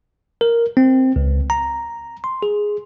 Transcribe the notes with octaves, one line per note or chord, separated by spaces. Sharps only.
A#4
C4
C#2
A#5
C6
G#4